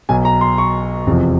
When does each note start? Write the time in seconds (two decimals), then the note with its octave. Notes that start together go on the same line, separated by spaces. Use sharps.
0.09 B1 B2 F#3 G#5
0.25 A#5
0.41 C6
0.58 C#6
1.07 F1 E2 C3 F3